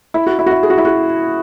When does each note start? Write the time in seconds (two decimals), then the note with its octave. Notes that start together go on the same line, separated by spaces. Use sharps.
0.14 E4
0.27 F#4
0.39 E4
0.46 F#4
0.51 E4
0.63 G#4
0.70 F#4
0.78 E4
0.85 F#4